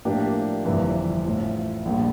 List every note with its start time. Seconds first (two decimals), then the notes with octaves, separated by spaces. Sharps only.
0.05 A2 F3 A#3 D4 G4
0.65 G1 F2 C3 E3
1.25 A1 A2 F3
1.85 A#1 A#2 G3